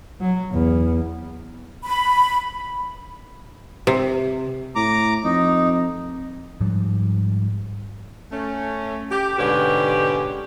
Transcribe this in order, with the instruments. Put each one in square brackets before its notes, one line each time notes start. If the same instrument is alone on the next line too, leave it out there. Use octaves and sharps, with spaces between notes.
[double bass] F#3
E2
[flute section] B5
[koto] C3
[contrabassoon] A2 [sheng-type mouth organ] A#5 D6
[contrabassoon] F2 [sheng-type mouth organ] D#4
[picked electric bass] G#2 F3 G3
[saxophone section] A3 C#4
G4
G#2 B2 D3 C#4 G4 B4